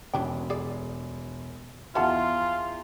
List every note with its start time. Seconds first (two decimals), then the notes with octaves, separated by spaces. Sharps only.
0.14 E1 C#4 D4 G5
0.50 G#4 A4 D5
1.95 E2 F4 F#4 E5 F#5 A5